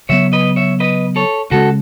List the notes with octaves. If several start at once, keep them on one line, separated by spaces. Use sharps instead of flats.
C#3 F#3 B3 C#5 E5
B4 D#5
C#5 E5
B4 D#5
A4 C#5
C#3 G#3 C#4 F#4 A4